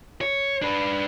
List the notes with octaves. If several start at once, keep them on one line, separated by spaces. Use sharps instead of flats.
C#5
D4 B4